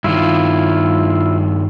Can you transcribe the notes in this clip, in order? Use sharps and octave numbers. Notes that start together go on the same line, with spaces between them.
G2 D#3 E4 F4